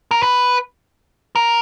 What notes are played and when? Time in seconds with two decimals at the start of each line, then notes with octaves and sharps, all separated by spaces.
0.11 A#4
0.23 B4
1.36 A#4